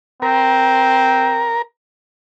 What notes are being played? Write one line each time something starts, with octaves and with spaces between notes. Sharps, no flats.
C4 A#4